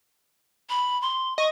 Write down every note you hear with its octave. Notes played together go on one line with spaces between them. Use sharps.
B5
C6
D#5 C#6